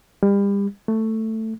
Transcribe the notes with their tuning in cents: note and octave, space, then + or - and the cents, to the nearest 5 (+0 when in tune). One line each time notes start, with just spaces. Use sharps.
G3 +35
A3 +10